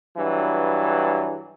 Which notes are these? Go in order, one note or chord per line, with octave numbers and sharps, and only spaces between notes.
G2 E3 F#3